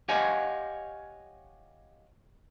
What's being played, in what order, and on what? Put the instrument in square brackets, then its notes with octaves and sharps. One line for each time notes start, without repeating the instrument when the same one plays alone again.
[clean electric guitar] G4 C#5 D#5 F5 F#5 G#5